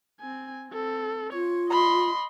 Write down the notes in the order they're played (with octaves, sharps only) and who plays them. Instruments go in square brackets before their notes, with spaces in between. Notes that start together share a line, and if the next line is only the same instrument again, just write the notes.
[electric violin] C4 G#5
C4 A4
[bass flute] F4 [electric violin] C#5
[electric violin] D#5 C6 [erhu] B5